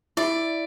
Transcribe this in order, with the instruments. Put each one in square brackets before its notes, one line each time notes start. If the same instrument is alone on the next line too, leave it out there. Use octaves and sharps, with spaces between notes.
[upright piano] E4 [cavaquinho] D5